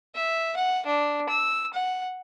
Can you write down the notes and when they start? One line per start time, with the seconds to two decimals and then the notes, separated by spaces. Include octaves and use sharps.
0.15 E5
0.57 F#5
0.86 D4
1.29 E6
1.74 F#5